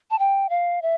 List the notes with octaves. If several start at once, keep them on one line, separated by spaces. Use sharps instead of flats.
A5
G5
F5
E5